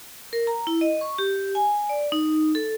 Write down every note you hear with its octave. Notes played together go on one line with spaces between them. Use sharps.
A#4
A#5
E4
D#5
C#6
G4
G#5
D5
D#4
A4